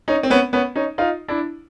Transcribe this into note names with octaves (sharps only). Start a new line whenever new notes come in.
C#4 D#4
C4
B3 C#4
B3 C#4
C#4 D#4
D#4 F4
D4 E4